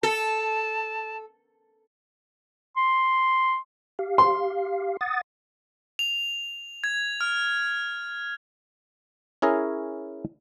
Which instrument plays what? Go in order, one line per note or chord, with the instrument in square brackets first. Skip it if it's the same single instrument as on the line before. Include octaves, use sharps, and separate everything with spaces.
[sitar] A4 [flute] A5
[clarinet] C6
[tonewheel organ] G4 F5
[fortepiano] C6
[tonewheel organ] F#5 D#6 A6
[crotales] F7
G#6
F6
[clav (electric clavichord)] C#4 E4 G#4 A#4 C#5